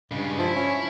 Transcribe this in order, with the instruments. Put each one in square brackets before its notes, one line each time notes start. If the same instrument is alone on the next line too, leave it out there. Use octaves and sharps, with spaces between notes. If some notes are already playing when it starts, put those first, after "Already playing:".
[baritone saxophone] G2 [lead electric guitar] C#3 G#3
[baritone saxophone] F3 [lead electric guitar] E4
[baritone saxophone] C#4